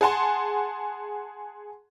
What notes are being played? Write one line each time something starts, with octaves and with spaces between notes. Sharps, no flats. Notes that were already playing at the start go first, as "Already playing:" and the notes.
G#4 F#5 A5 C6